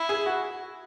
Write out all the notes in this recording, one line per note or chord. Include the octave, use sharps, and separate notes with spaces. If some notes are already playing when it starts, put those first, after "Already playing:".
Already playing: E4
G#4
F#4